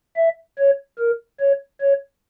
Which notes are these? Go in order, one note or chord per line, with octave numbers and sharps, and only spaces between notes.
E5
C#5
A#4
C#5
C#5